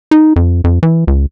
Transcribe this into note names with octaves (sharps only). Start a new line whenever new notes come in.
D#4
F2
F2
E3
C#2